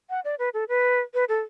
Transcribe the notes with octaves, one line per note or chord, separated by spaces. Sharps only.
F#5
D5
B4
A4
B4
B4
A4